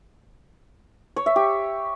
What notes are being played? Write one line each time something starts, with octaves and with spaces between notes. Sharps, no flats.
C#5
E5
G4